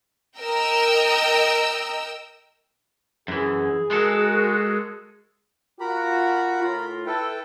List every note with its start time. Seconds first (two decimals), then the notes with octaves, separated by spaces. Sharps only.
0.39 A#4 D#5 G5 A#5 E6
3.28 F#2 E3 G#4
3.91 G#3 F#4 A4 A#4
5.80 F4 F#4 A#4 A#5 B5
6.63 A2 F4
7.06 E4 A4 B4 G5